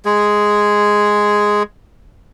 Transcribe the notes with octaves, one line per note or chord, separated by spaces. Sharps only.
G#3 G#4